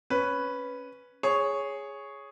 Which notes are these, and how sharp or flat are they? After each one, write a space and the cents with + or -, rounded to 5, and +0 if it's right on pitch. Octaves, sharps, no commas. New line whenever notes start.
C#4 +0 B4 +0
G#4 +0 C#5 +0